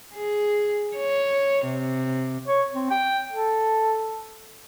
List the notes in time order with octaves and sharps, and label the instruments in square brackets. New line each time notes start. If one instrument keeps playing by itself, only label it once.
[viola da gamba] G#4
C#5
C3
[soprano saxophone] C#5
C4
G5
A4